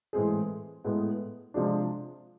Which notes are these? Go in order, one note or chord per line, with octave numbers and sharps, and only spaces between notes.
A2 E3 G#3 C4 G#4
A2 G#3 B3
C3 F3 G#3 D4